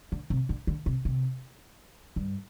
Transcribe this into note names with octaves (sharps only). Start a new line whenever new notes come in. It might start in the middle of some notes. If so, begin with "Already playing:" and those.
D3
C3
D3
D3
C3
C3
G2